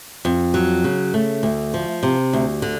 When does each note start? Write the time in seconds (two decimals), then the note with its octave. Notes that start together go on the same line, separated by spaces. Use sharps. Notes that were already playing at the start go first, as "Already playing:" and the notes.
0.25 F2
0.54 F#3
0.84 C#3
1.14 A3
1.43 D2
1.74 F3
2.03 C3
2.33 D2
2.62 D3